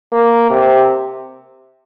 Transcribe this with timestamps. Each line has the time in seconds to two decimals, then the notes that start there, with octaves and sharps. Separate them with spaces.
0.12 A#3
0.50 C3